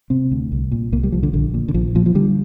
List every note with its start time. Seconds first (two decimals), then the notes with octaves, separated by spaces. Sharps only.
0.10 C3 C4
0.32 D2
0.52 C2
0.71 A#2
0.92 C2 A#3
1.03 G3
1.12 C2 F3
1.23 D3
1.33 A#1 D3
1.54 A#2
1.68 D3
1.74 A#1 F3
1.95 A#2 F3
2.06 F3
2.15 D3 G3